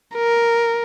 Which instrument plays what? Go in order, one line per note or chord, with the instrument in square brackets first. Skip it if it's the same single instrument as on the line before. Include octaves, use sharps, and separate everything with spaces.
[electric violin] A#4